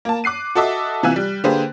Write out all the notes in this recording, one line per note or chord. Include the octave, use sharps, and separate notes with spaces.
A#3 A5
D6 F#6 C7 D#7
F#4 A4 D#5 E5 D6
C3 E3 F4 G#5 E6 F#6
G3
D3 A#3 G4 G#4 B4 C5